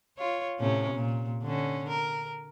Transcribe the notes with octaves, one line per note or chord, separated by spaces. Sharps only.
F4 C#5
A2 C3 C#4
A#2
D3 C#4
A#4